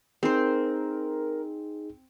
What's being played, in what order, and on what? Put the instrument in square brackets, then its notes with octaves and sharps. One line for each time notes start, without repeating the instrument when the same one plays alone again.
[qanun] C4 C5 [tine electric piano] D#4 G#4 [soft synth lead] A#4